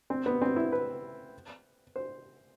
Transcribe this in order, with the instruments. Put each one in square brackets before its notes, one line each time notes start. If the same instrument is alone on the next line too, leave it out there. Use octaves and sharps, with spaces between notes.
[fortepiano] C4
B3
C4
E4
B4
C5